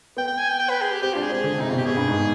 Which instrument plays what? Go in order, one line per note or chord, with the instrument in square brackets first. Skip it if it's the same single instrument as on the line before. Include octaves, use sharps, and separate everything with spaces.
[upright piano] B3 [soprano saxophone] G5
[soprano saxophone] G5
G#5
G5
G5
B4
G#4
G4
[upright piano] C4 [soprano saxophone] G4
[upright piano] D4 [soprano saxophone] F4
[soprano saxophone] G#4
[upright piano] C4
[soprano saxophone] G#4
[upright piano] D3
C3
[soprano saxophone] D#4
[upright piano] B2 [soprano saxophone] F4
[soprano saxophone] G4
[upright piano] B2 [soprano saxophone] G#4
[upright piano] G2
G#2